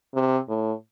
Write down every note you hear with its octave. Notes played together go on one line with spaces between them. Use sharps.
C3
A2